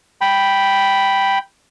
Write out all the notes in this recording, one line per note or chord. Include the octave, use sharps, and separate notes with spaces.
G5 B5